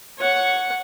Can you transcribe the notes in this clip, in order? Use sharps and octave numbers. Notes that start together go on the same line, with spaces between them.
C#5 F#5